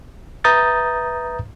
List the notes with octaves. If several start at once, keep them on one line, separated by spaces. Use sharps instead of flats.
B4 E5 A#5 D#6 G6 A6